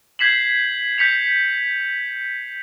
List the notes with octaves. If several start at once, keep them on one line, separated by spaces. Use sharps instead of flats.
G6 G#6 B6 C7 E7 F#7
G6 B6 C#7 F7